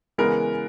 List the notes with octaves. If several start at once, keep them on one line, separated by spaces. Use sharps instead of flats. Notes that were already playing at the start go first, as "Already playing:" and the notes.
C#3 E3 G#3 B3 A#4